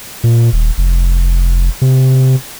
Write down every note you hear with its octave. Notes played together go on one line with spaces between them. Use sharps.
A#2
D#1
F1
C3